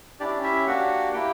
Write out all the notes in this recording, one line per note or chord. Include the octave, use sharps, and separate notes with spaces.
C#4 D4 E4 G4 D5
E4 E5
A#3 D4 F#4 G4 F#5
A#3 E4 G4 G5